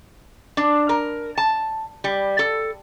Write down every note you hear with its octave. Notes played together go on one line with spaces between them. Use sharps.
D4
A#4
A5
G3
A4